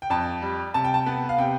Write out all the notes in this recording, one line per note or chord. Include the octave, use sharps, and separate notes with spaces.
G5
F2 A5
G3
C3 A5
G5
A5
B3
F5
C3 G5